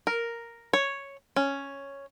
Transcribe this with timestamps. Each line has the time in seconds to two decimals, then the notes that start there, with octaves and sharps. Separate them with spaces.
0.07 A#4
0.73 C#5
1.36 C#4